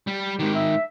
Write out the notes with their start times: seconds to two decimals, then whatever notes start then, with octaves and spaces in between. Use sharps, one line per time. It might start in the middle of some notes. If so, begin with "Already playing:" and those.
0.07 G3
0.39 G#2 D#3 G#3 D#4 G4
0.55 E5